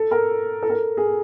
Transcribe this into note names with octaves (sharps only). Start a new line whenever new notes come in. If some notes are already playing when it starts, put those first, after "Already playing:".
Already playing: A4
A#4
A4
A#4
A4
G#4